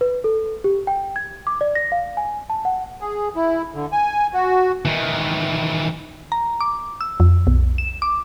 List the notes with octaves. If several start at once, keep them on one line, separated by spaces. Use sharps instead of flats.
B4
A4
G4
G5
G#6
D6
D5
A#6
F5
G#5
A5
F#5
G#4
E4
D3
G#5
F#4
D#3 E3
A#5
D6
E6
F2
B1
E7
D6